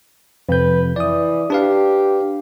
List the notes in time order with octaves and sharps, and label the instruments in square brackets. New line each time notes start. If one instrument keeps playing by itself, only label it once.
[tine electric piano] F2 C3 G6 [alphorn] B4
[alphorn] E3 [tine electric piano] D5 D#6
[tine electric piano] D4 B4 F5 [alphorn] G4